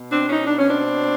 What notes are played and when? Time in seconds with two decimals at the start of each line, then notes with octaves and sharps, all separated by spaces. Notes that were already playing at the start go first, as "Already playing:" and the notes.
Already playing: B2
0.11 C4 D4
0.29 C#4 D#4
0.46 D4
0.59 C#4
0.70 C4 D4